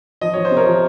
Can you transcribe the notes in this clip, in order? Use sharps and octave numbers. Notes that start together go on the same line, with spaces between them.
F3 D#5
F3 C#5
C5
C3
A#4 C#5
F3